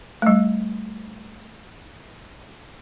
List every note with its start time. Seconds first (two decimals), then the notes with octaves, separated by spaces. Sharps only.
0.22 G3 A3